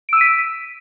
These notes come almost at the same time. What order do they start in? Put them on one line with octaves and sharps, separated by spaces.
D7 E6 D#7 B6